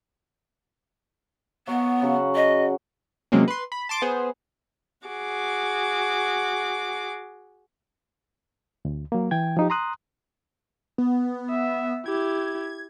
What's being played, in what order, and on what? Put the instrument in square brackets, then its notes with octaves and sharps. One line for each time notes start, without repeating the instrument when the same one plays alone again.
[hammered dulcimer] F#3 F#4 F#5 [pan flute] B3
[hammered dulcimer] C#3 F#3 F#5
[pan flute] D#5
[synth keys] C3 F#3 G#3 A#3 C4 C#4
B4 C6
B5
A5 C6 D6
B3 G#4 C5
[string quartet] F#4 G#4 D6
[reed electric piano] D2
F#3 A#3
E3 G5 G#6
F3 D#4 G4
A#5 C6 D#6 F#6
[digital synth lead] B3
[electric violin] E5
[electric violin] E4 G4 [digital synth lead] G#6